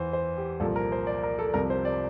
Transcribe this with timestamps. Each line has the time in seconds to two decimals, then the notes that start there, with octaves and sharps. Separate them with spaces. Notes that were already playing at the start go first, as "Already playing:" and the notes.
Already playing: E2 E3 C5
0.13 C5
0.38 G4
0.60 C2 A#2 F3 A4
0.76 A#4
0.92 C5
1.07 D5
1.23 A#4
1.39 A4
1.54 C2 C3 F3 A#4
1.70 C5
1.85 D5